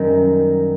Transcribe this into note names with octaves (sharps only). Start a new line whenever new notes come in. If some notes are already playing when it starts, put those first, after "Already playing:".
Already playing: F#2 D#3 G3